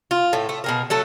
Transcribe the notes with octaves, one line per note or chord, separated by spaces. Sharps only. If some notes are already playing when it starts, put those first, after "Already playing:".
F4
A2 A3
A3
B2 G#4 A#4
F#3 A3 A4